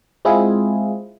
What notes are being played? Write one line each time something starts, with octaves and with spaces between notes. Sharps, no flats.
G#3 C4 E4 F4 G#4